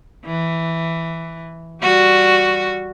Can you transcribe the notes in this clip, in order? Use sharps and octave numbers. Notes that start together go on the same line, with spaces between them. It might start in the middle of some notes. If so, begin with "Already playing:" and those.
E3
G3 F#4